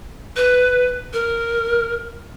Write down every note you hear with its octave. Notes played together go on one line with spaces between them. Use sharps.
B4
A#4